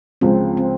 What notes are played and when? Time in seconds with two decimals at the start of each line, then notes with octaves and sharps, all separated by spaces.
0.21 C#2 C#3 F3 C4
0.57 C4